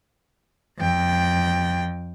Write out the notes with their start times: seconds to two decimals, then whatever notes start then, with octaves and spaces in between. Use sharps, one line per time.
0.78 F2 G5